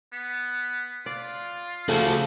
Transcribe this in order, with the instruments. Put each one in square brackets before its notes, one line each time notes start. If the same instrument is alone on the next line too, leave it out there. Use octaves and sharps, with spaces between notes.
[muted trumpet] B3
[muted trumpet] F4 [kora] D5
[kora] C#3 F3 [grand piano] A3 [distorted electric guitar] F#4 A4